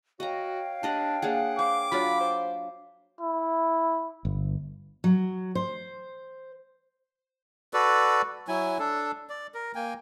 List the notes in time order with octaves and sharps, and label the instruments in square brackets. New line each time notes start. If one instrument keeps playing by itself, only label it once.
[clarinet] F#4 [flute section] C#5 F5 G5 [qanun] D#5 A#5
[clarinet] D4 [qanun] G4 D#5 F#5
[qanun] A#3 D4 G#4 [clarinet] F#5
[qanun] C5 [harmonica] D6
[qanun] F#3 D4 F4 [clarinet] B5
[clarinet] C5
[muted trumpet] E4
[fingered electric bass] G1
[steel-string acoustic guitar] F#3
C5
[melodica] F#4 A4 B4 D5
F#3 E4 G#5
D4 A4
D5
A#4
A#3 G5 G#5